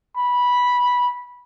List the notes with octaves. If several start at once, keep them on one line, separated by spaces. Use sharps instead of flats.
B5